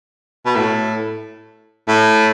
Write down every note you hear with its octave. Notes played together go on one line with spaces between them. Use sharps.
B2
A2
A2